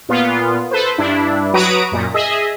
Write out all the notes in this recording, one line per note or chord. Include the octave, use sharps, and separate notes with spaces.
A#2 B3 F4
A4 B4 C5
G2 D4 E4
F#3 F#4 B4 A#5 D#6 D7
F#2 A#2
G#4 D#5 E5